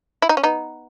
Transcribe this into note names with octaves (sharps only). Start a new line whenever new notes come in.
E4
D#4
C#4
B3 D#4